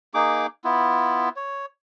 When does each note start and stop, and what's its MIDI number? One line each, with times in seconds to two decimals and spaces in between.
0.14 0.47 58
0.14 0.47 63
0.14 0.47 68
0.14 0.47 86
0.64 1.29 59
0.64 1.29 64
0.64 1.29 65
1.36 1.66 73